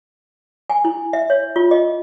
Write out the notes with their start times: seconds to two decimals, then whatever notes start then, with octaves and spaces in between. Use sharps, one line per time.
0.70 G#5
0.85 E4
1.13 E5
1.30 C#5
1.56 F4
1.71 D#5